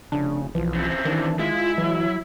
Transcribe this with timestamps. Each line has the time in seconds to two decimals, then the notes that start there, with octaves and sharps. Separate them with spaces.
0.12 F1 C#3 D4
0.55 B1 E3 F3
0.75 C#3 C4
1.05 D#3 E3 D4
1.39 G#3 E4 F4
1.78 E3 F#3